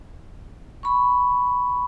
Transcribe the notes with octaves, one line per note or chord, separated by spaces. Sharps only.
B5 C#6